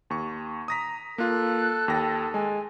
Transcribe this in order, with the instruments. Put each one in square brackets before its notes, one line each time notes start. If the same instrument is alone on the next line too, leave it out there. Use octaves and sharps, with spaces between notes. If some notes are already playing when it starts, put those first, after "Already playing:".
[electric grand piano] D#2 C#6
[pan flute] A#5 [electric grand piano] D#6 A#6 B6
[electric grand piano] A#3 F4 [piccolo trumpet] A4 [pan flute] F#6
[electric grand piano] D#2 A#6 [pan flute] G5
[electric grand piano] G#3 [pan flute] G#5